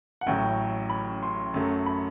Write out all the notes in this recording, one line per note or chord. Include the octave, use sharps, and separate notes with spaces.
F#5
A1 A2 F#3 G5
B5
C6
F#2 F#3 A3
B5